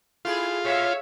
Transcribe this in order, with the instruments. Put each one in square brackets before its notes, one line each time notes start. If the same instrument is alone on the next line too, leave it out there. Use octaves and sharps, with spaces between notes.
[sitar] A3 E4 G#4 [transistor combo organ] F4
[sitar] A#2 [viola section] C#5 E5 F5